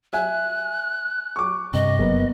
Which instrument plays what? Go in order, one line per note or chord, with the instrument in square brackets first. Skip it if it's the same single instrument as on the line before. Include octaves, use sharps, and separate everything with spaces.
[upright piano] E5 G#5 [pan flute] F#6
[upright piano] C#6 D6
[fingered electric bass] G2 C3 [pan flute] D#5
[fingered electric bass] F#1 F#3 [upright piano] A#3 B3